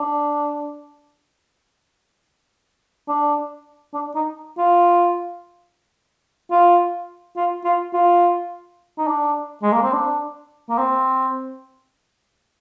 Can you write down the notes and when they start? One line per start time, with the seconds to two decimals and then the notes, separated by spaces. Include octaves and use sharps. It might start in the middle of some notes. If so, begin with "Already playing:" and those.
Already playing: D4
3.08 D4
3.94 D4
4.15 D#4
4.58 F4
6.51 F4
7.36 F4
7.64 F4
7.93 F4
8.98 D#4
9.07 D4
9.63 G#3
9.73 A#3
9.83 C4
9.93 D4
10.69 A#3
10.78 C4